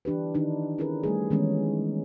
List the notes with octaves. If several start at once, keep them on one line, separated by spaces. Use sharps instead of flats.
E3 D4 G4 B4
D#3 D4 D#4
C#4 E4 G#4 A#4 B4
G3 A3 G#4
D#3 E3 G#3 B3 C#4